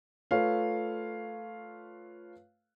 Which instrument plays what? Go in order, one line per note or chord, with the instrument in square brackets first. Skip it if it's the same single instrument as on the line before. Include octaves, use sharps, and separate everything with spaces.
[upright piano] A3 F4 A4 B4 C#5 F5